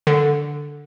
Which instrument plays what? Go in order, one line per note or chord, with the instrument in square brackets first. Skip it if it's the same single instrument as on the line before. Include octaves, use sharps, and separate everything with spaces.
[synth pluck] D3